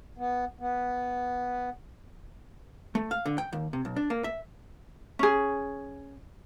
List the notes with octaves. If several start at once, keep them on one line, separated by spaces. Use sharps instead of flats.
B3
B3
A3
F5
D3
G5
D#2
C3
B1
D4
A#3
E5
C#4 G#4